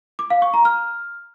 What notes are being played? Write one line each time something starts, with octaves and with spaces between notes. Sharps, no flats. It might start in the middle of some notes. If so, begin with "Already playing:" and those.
D6
F5
C#6
A#5
F6